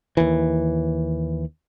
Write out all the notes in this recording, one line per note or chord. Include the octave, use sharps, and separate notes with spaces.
D#2 E3